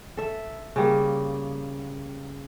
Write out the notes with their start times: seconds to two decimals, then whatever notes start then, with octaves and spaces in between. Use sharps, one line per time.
0.17 A4 E5
0.76 C#3 G3 A#3